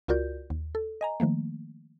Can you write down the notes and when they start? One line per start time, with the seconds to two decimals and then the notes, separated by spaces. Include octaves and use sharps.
0.08 C#2 F4 F#4 A#4 D5 G6
0.50 D#2
0.75 A4
1.01 D#5 G#5 A#5
1.20 D#3 F3 A3 A#3